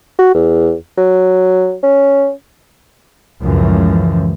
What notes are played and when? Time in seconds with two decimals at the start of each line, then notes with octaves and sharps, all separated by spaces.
0.19 F#4
0.35 E2
0.98 F#3
1.83 C#4
3.42 C#2 F#2 A2 E3 F3